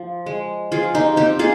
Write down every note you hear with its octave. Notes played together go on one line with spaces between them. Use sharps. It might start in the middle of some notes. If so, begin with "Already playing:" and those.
Already playing: F3
G#3
F3 F4 G#4
D#4 G4
C4 D#4 G4
F4 G#4